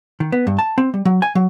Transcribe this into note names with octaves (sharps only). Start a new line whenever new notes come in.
D#3
B3
G2
A5
C4
G3
F#3
G#5
F#3